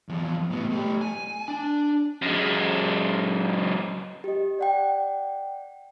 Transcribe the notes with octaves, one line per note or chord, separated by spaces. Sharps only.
E2 F3
A2 B3
A3 G4
G#5
D4
F#2 G#3
G4 D#5
D5 F#5 G5